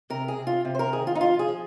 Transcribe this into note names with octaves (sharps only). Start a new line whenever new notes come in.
C3 A#4
G#4
C3
F4
C3
C5
A#4
D#3 G#4
F4
D#4
F3 F4
G#4
F3